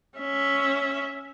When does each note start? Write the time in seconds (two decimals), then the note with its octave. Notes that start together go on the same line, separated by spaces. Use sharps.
0.19 C#4 E5